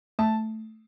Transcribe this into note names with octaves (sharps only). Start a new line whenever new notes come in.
A3 A5